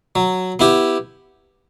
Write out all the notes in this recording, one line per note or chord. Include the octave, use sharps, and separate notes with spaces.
F#3
B3 E4 G4